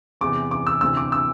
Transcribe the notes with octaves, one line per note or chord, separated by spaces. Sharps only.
E2 C3 E3 D6
D6
E6
D2 C3 E3 E6
D6
E6